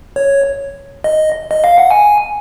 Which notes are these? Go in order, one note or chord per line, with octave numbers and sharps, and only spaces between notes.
C#5
D#5
D#5
F5
F#5
G#5